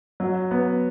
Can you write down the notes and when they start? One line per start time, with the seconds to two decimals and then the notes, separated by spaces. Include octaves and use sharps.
0.20 F#3
0.51 B3